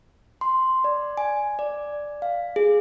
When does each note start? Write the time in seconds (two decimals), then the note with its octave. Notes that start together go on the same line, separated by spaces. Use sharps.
0.41 C6
0.84 D5
1.17 G#5
1.59 D5
2.22 F5
2.56 G#4